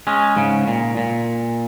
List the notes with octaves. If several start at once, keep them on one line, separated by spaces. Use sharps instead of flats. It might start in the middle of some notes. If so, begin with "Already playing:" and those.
G#3 C#4
G#2 C#3
A#2
A#2